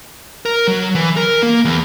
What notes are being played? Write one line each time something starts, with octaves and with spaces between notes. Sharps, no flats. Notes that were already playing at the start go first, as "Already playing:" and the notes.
A#4
F#3
E3
A#4
A#3
E2